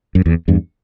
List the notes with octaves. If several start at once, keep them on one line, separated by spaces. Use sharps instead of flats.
F#2
E2
E2 G2